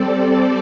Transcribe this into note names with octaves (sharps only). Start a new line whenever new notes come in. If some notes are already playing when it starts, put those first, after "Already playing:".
Already playing: G3 C4 A4 D5